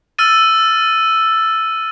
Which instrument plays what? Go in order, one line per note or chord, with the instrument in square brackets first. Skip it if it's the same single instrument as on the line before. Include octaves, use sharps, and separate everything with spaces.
[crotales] E6 F6 A6 D#7